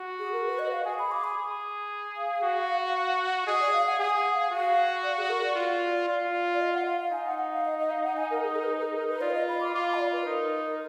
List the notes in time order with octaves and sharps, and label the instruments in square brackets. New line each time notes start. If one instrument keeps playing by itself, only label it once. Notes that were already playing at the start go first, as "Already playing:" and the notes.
Already playing: [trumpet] F#4
[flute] G#4
A#4
B4
D#5
F5
[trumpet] G#4 [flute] G#5
[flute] B5
D6
B5
[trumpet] G#4
[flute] F5
[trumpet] F#4
[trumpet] G#4 [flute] D#5
[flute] D5
F5
F#5
[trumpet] G#4 [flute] G#5
[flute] F#5
F5
[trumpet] F#4 [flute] F5
[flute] D5
G#4
A#4
D5
[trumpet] F4
F4
[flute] D5
D#5
F#5
F5
F5
[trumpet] D#4 [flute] G#5
[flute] F#5
F#5
F5
D#5
D#5
F5
F#5
G#5
A#4
G#4
A#4
B4
A#4
G#4
A#4
B4
[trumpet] F4 [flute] D5
[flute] D#5
B5
D6
[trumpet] F4 [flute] D6
[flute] B5
D#5
D5
B4
[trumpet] D#4 [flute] A#4